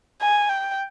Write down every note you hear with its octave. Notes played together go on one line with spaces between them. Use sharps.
G#5
G5